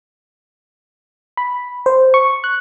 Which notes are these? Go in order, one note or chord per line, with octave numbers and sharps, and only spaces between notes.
B5
C5
C#6
F#6